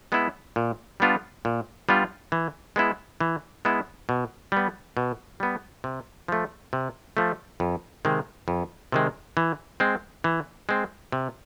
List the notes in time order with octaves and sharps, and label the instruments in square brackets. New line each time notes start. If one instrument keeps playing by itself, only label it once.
[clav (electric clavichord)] G#3 B3 E4
A#2
G3 B3 D4 F4
A#2
G3 B3 D4 F4
E3
G#3 B3 E4
E3
G#3 B3 E4
B2
G3 B3
B2
G3 B3
C3
F3 A3
C3
F3 A3
F2
C3 D#3 G#3
F2
C3 D#3 G#3
E3
G#3 C4
E3
G#3 C4
C3